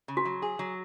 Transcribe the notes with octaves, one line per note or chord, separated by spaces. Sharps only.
C#3
F#4
F#3
G#4
F#3